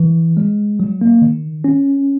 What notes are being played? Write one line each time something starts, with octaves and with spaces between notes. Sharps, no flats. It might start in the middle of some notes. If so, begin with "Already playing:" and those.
Already playing: E3
G#3
F#3
A#3
D#3
C#4